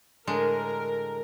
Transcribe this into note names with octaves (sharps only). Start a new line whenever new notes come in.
A2 D3 G#3 A#4